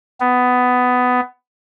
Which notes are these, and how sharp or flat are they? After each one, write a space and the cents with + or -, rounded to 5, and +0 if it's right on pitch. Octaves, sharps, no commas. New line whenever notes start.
B3 +15